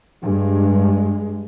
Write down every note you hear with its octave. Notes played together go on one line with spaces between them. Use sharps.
G2 G#3